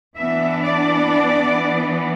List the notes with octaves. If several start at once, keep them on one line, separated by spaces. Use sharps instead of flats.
E3 B3 D4 E5
D5